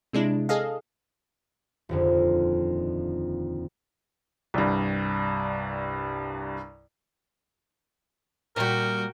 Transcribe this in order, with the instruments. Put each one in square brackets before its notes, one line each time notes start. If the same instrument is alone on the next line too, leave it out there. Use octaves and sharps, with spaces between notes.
[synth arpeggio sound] C3 G#3 D4 E4
G#4 A4 D#5 F5
[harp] D#1 F2 D3
[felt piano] C2 G2
[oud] A#2 G3 [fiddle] F#4 G5 [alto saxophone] A#4